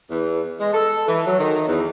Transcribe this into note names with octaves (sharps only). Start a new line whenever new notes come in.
E2
G#3
A4
E3
F#3
D#3
E2